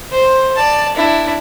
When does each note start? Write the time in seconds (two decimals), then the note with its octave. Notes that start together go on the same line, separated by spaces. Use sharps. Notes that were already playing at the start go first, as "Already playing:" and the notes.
0.11 C5
0.56 D5 A5
0.97 D4 E4